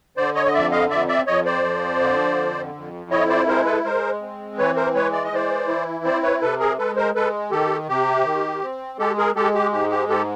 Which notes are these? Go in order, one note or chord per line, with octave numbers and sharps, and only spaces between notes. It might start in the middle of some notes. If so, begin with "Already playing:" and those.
D3 C5 D5
C#5 D#5
D#5
F2 D5 E5
D#5 F5
F2 D5 E5
D5 E5
F2 C#5 D#5
C5 D5
F3
D3
F2
F2
E4 C#5 D#5
C5 D5
G#3 A#4 C5
A4 B4
G#3 A#4 C5
C4
E3 B4 C#5
A#4 C5
G#3 B4 C#5
D5
D#5
E3 C5 D5
E4
C4 C5 D5
B4 C#5
C3 A4 B4
G#4 A#4
G#3 A4 B4
A#4 C5
G#3 A4 B4
D#3 G4 A4
C3 G4
D#3
C4
G#3 G4 A4
G#4 A#4
G#3 G4 A4
G4
G#2 G4
G4
G#2 G4 A4